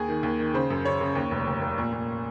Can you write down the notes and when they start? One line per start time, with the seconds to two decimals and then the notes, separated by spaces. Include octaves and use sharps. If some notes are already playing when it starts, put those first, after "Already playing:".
Already playing: D#2 G#4
0.08 D#3
0.23 D#2
0.39 D#3
0.54 C#3 C5
0.70 F#2
0.85 C#3 C#5
1.01 C#3
1.15 D#2
1.31 F1
1.47 F1
1.62 F1
1.78 A#2
1.93 A#2